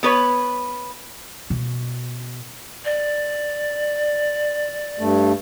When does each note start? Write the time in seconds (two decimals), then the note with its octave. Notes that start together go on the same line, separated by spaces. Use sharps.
0.03 B3 B4 C#5
1.50 B2
2.85 D5
4.99 G2 A3